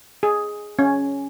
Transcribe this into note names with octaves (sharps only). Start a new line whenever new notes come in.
G#4
C#4